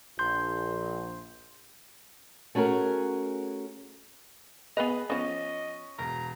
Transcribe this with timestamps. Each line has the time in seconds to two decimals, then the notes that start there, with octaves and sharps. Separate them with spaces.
0.19 A#1 C6 G6
2.55 A3 C#4 F#4 G#4 A#4
4.77 B3 G#4 B4 D#5 F7
5.10 F3 B3 C#4 D#5
5.98 E1 A#5